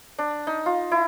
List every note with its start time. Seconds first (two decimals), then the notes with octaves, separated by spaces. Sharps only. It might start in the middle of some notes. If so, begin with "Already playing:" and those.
0.19 D4
0.47 D#4
0.66 F4
0.92 E4